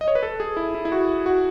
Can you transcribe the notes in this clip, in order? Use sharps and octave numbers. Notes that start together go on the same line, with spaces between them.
D#5
C#5
B4
A4
G#4
E4
E4
E4
F#4
F#4